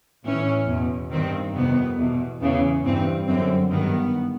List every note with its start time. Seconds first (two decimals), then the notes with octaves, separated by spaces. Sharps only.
0.24 A2 E3 C#4
0.67 E2 B2
1.10 G2 D#3 C4
1.54 F2 C3 D#3 B3
1.98 E2 B2
2.40 E2 C#3 E3 B3
2.84 G2 E3 C4
3.27 F#2 D3 C4
3.70 G2 D#3 B3